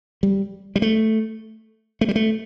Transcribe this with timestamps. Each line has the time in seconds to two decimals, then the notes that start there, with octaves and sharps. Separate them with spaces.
0.23 G3
0.76 G3
0.82 A3
2.01 A3
2.08 G3
2.16 A3